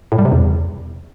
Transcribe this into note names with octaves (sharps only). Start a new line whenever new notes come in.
A2
G3
C3
E2